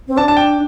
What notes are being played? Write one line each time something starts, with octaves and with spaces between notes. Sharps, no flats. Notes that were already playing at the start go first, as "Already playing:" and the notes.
C4
D4 A5
A5
G5